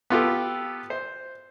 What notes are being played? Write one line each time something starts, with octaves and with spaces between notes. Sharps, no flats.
B3 F4 G4 A4
C5